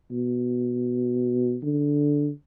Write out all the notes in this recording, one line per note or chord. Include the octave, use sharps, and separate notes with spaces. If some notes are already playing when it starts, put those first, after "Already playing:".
B2
D3